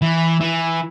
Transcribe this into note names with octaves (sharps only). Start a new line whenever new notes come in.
E3
E3